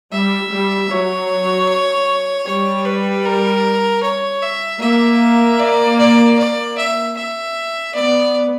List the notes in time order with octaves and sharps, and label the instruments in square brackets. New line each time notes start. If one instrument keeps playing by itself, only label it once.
[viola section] G3 [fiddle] E5
[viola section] G3
[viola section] F#3 [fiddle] C#5
[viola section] G3 [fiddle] C#5
[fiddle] B4
A#4
C#5
E5
[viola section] A#3 [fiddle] E5
[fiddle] D5
D5
D5
E5
E5
[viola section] B3 [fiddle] D5